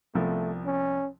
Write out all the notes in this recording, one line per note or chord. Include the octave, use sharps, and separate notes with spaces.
C2 F3 A3 B3
C#4